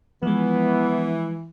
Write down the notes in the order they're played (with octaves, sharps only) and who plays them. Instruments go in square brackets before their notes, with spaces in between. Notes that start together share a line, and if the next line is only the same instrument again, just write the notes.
[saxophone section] E3 [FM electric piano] F3 G#3 [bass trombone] B3